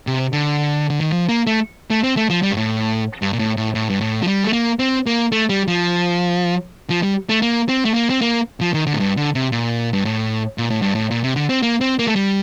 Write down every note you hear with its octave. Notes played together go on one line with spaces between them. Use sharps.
C3
D3
D3
D#3
F3
A#3
A3
A3
C4
A3
F3
G3
G2
A2
G2
A#2
A2
A2
A2
G2
A2
F3
G3
A3
A#3
C4
A#3
A3
G3
F3
F3
G3
A3
A#3
C4
A3
A#3
C4
A#3
F3
D#3
D3
A2
G2
D3
C3
A#2
G2
A2
A#2
A2
G2
A2
A#2
C3
D3
C4
A#3
C4
A#3
A3
G3